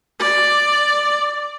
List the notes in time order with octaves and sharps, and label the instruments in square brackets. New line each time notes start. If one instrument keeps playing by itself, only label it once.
[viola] D5